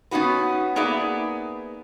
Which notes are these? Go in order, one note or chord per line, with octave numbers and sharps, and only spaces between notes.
B3 C#4 D#4 F#4 B4
A#3 B3 D#4 G#4 D5 E5